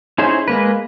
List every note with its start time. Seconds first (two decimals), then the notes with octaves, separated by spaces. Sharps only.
0.18 C#4 D#4 E4 G#4 C5
0.48 G#3 A#3 B4